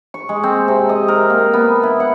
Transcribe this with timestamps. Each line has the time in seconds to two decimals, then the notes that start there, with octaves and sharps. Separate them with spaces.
0.14 C#6
0.29 G#3
0.44 C4
0.68 C3
0.89 D#5
1.08 A#4
1.30 A#3
1.53 B3
1.83 E4
2.00 F#5